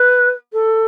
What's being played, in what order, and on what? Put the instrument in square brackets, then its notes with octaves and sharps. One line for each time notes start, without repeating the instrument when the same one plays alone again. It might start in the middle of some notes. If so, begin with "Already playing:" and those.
Already playing: [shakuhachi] B4
A4